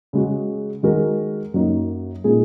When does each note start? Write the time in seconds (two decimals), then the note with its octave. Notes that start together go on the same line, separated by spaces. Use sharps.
0.13 C#3 G#3 F#4
0.83 D#3 G#3 F#4 A#4
1.54 F#2 F#3 A#3 D#4 F#4
2.24 A#2 G#3 D#4 G#4